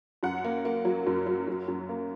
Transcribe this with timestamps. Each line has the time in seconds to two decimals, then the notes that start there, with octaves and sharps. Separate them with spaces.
0.23 F#2 F#5
0.45 A#3
0.65 A#3
0.85 F#3
1.07 F#2
1.26 F#3
1.47 F#2
1.68 F#2
1.89 A#3